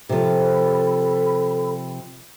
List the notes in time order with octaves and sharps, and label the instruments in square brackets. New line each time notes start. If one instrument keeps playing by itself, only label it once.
[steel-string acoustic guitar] C3 F3 [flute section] A4 B5